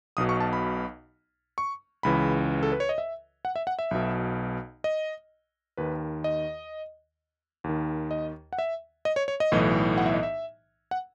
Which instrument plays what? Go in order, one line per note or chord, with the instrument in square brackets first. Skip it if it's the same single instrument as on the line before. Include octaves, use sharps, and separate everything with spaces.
[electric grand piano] B1 B2 D#6
C#6
A5
B5
C#6
C#2 C#3 E3 B5
A4
B4
C#5
D#5
E5
F#5
E5
F#5
E5
B1 B2
D#5
D#2 D#3 B4
D#5
D#2 D#3
D#5
F#5
E5
D#5
C#5
C#5
D#5
B1 A2 E3
F#5
E5
D#5
E5
F#5